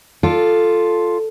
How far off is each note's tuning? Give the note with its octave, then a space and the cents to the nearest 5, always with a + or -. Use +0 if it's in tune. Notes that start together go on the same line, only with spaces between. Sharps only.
F4 +0 A4 +0 D5 +0